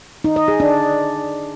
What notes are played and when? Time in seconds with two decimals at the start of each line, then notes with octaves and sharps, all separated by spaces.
0.24 D#4
0.36 D#5
0.48 G#4
0.60 D4